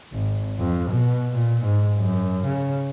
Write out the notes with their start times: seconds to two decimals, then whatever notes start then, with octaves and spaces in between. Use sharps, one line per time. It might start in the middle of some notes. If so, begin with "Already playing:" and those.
0.13 G#1
0.59 F2
0.91 B2
1.33 A#2
1.64 G#2
1.98 F#2
2.45 C#3